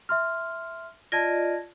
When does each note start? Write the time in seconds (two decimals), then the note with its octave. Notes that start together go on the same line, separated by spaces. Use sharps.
0.09 E5 C6 F6
1.12 F4 D5 D#5 A5 G#6 A#6